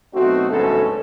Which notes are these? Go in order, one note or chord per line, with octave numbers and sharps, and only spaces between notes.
B1 A3 C4 D#4 F#4
G1 D2 G#2 B2 C#4 A4